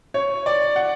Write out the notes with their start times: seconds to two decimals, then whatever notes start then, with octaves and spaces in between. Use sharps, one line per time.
0.14 C#5
0.46 D5
0.76 F#5